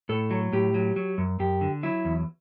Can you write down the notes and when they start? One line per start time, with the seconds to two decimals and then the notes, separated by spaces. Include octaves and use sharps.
0.09 A2 A4
0.31 F#3
0.53 A2 G4
0.74 F#3
0.96 F#3
1.18 F#2
1.39 F#2 G4
1.61 D3
1.83 F#3 E4
2.05 E2